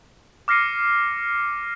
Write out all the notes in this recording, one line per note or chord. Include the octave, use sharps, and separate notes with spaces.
D6 F6 A#6 C7 C#7 D#7